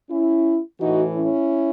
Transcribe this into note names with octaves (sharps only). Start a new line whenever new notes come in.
C#4 E4
A2 E3 D#4 F#4
C#4 E4